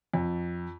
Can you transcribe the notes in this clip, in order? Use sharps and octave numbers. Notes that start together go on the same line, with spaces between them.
F2